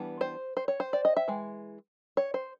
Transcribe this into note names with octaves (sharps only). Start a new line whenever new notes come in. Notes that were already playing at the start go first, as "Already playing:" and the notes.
Already playing: E3 G3 B3 D4
C5
C5
C#5
C5
D5
D#5
E5
E3 G#3
C#5
C5